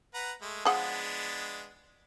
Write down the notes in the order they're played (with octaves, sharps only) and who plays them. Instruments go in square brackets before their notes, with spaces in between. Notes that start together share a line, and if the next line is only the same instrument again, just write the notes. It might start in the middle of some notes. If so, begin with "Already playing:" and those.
[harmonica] B4 F#5 A#5
G#3 A3
[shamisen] F3 G#4 F#5 [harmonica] G#3 B3 D4